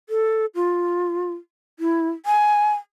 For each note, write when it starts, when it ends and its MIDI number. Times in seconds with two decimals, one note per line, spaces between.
0.09 0.46 69
0.55 1.33 65
1.79 2.08 64
2.26 2.74 80